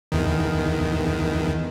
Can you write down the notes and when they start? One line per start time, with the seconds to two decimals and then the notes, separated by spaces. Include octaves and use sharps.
0.12 E2 D#3